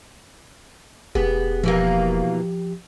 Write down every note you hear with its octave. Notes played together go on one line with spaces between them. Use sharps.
E1 B3 G4 G#4
B2 E3 F3 A#3 G4